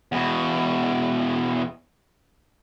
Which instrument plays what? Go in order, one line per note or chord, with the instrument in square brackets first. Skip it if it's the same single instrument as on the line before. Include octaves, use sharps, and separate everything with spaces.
[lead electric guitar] E2 B2